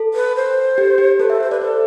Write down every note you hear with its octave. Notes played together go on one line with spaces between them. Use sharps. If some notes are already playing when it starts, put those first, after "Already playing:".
Already playing: A4
B4
C5
G4
G4
A4 B4
A4 E5
C5 E5
B4 D5
A4 C5